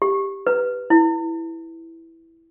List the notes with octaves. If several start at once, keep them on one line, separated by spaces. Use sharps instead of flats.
G4
B4
E4